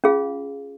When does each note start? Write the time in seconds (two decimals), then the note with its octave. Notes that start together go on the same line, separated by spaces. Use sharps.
0.04 C#4 F4 G#4 F5